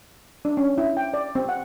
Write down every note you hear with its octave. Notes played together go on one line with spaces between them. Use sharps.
D4
C#4
E4
G5
D5
C4
F#5